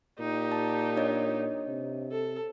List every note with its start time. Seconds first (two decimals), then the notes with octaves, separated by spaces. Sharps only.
0.19 A#2 D#4 G4
0.52 A5
0.97 D4 C#5 D#5
1.68 C3
2.12 A4